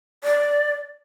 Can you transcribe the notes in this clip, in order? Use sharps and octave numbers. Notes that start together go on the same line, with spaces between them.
D5